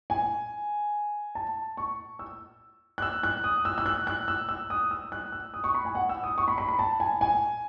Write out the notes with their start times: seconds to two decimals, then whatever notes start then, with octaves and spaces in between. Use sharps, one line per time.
0.10 G#5
1.35 A5
1.77 C#6
2.19 E6
2.98 F#6
3.02 E6
3.23 F#6
3.44 D#6
3.65 E6
3.78 E6
3.86 F#6
4.07 F#6
4.28 E6
4.49 E6
4.70 D#6
4.91 E6
5.12 F#6
5.32 E6
5.54 D#6
5.64 C#6
5.75 B5
5.85 G#5
5.95 F#5
6.09 E6
6.24 D#6
6.38 C#6
6.48 B5
6.58 B5
6.68 B5
6.79 A5
7.00 G#5
7.21 G#5